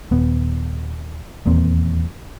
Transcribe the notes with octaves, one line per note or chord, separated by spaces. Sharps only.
D#1 B3
D#1 E2 A#3 C4